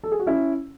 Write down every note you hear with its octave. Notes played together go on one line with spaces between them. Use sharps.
A4
G#4
F#4
C#4 E4